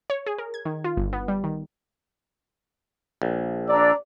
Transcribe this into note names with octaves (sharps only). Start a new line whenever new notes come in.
C#5
G#4
A#4
G#6
D#3
F4
G1
B3
G3
D#3
A#1
D4 D5 A#5 E6